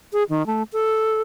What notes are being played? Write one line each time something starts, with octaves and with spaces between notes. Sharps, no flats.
G#4
D#3
A3
A4